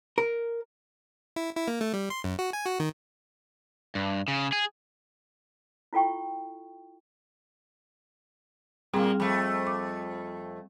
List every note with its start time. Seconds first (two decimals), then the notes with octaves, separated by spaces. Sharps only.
0.18 A#4
1.36 E4
1.56 E4
1.68 A#3
1.81 A3
1.94 G3
2.10 C6
2.24 F#2
2.39 F#4
2.53 G#5
2.66 F#4
2.80 D#3
3.95 G2
4.28 C#3
4.52 G#4
5.93 E4 F4 A4 G5 C#6
8.94 A#2 G3 A#3 C4 G#4
9.20 F2 A3
9.67 D6